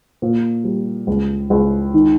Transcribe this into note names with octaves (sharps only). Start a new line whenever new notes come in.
A#2
G3
C#2
C#2
D#3